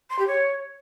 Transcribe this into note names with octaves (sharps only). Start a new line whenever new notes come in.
C6
G4
C#5